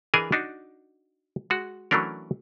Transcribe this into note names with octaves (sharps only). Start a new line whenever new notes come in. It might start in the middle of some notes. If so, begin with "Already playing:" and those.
E3 D4 G#4 A#4 D#5 G#5
D4 D#4 F#4
G#3 F#4
E3 F#3 A3 C#4 D4 A#4